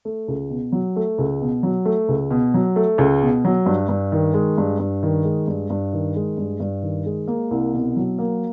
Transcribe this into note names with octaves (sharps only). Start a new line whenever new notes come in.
A3
C#2
B2
F#3
A3
C#2
B2
F#3
A3
C#2
B2
F#3
A3
C#2
B2
F#3
G2
G2
D#3
G#3
G2
G2
D#3
G#3
G2
G2
D#3
G#3
G2
G2
D#3
G#3
A#3
C2
B2
F#3
A#3